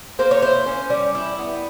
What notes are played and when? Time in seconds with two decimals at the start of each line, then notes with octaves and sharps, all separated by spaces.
0.19 A#3 C5
0.31 C#5
0.42 E4 C5
0.66 C#4
0.90 G3
1.15 E4
1.38 B3